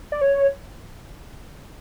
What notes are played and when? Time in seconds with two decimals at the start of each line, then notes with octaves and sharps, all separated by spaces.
0.12 D5
0.21 C#5